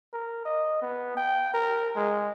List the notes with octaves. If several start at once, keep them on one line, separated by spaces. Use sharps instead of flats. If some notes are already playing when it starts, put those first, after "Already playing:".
A#4
D#5
B3
G5
A#4
G#3